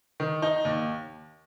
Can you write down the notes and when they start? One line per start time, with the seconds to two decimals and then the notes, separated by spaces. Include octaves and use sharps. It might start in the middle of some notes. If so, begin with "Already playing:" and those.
0.20 D#3
0.42 D#4
0.65 D#2